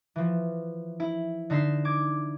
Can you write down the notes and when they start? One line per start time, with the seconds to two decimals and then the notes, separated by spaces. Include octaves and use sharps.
0.16 E3 F3
1.00 E4
1.50 D3 D#4 E6 B6 C7
1.85 D6 G#6